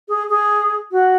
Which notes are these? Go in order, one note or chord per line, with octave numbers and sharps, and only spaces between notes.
G#4
G#4
F#4